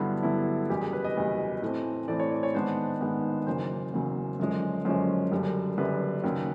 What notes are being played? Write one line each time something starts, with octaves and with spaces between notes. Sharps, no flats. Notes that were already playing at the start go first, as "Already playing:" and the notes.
Already playing: G2 D3 F#3 B3 E4 A4
G2 D3 F#3 B3 E4
F#1 E2 B2 G3 G4
G#4
B4
D#5
F#1 E2 B2 G3
A2 E3 A3 C4
A2 E3 A3 C4 D5
C#5
D5
C#5
G#2 D#3 G#3 B3 D4 C5
G#2 D#3 G#3 B3 D4
F#1 E2 C#3 F#3 A#3 C5
F#1 E2 C#3 F#3 A#3
F#2 D3 F3 G#3 C#4
F#2 D3 F3 G#3 C#4 C5
F#1 F#2 D3 G3
F#1 F#2 D3 G3 B4
D#2 C#3 F#3